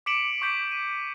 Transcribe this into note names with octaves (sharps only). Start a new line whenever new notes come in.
D6 B6 C#7 D7 E7 F#7
C#6 D6 G6 B6 D7 F#7
D#7